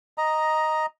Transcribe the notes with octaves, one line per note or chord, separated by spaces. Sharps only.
D#5 A#5